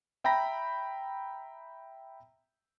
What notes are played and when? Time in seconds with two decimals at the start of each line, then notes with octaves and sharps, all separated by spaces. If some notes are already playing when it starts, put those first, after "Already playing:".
0.24 E5 G5 A#5 B5 A#6